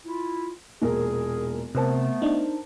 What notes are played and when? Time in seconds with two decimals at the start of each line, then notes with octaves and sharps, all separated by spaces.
0.05 E4 F4
0.82 E1 A#2 G#4 A#4
1.75 C3 A3 B3 A#4 C5 A5
2.22 D4 D#4